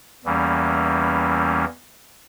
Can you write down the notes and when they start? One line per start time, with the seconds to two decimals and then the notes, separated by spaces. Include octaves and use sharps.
0.24 E2 E3 G3 A#3 C#4